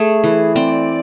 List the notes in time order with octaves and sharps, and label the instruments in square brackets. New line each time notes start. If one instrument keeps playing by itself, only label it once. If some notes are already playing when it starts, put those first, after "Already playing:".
Already playing: [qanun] A3 [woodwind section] G#4
[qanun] E3
[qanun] C4 [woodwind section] D5